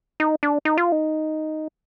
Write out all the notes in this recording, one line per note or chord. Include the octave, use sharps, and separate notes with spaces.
D#4
D4
D#4
F4
D#4